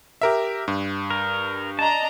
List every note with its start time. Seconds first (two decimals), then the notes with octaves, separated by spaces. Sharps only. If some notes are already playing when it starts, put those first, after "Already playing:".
0.21 G4 A#4 E5
0.68 G2
1.10 A#4
1.79 D4 D#5 A5 A#5